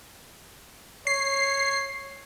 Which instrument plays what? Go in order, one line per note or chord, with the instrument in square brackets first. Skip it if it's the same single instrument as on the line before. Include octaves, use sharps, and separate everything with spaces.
[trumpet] C#5 [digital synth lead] C7